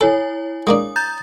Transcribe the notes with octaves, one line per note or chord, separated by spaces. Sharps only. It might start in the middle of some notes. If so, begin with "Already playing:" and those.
E4 A4 C#5 G#5
G#3 A#3 D4 D#6
A#5 G6 A6